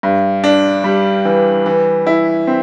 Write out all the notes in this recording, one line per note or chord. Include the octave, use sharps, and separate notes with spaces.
G2
D4
G3
E3
E3
E4
C4